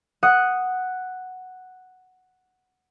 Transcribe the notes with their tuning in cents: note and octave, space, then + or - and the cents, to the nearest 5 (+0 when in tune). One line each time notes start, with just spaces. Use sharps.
F#5 +0 D#6 +0